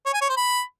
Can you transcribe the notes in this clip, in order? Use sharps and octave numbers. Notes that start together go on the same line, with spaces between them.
C#5
G#5
C#5
C5
B5